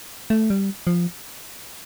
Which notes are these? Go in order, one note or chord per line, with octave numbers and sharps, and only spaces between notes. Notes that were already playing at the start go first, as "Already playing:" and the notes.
A3
G3
F3